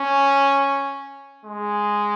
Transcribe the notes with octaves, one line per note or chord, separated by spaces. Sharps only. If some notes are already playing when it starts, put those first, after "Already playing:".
Already playing: C#4
G#3